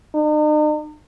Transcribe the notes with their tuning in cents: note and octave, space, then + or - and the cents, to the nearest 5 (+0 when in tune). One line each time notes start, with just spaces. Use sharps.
D#4 -45